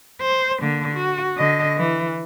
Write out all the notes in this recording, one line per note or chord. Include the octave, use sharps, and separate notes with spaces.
C5
D3 A#3
F#4
D3 D#5
E3